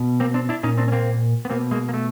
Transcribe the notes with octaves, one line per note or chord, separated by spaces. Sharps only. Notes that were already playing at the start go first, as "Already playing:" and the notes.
Already playing: B2
A#3 C4
C4 D4
D4 E4
A#2 C#4 D#4
C4 D4
C#4
A#3 C4
B3
B2 A#3 C4
G#3 A#3
A#3
A3